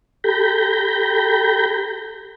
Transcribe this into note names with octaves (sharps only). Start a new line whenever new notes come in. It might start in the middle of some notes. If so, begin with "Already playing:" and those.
G4 A4 A#5 B5 G6